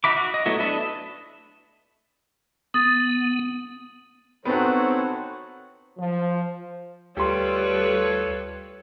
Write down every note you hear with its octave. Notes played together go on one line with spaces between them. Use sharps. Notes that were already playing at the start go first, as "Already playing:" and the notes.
D#4 F#4 E5 B5 D6
F#4
D#5
F#3 A3 B3 E4 F#4
D4 A4 B4 D#5 E5
B3 D#6 A6
B3 C4 D#4 F#4 A4 C5 C#5 F#5
F3
D2 G3 F4 G4 A4 B4 C#5 C6